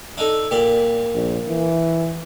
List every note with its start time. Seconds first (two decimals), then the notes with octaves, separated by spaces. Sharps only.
0.17 D4 D#4 A4
0.51 A#2 G4 D5
1.14 A#1
1.48 E3